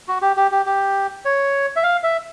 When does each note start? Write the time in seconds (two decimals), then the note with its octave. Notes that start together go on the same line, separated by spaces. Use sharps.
0.08 F#4
0.22 G4
0.37 G4
0.51 G4
0.66 G4
1.25 C#5
1.76 E5
1.83 F5
2.04 E5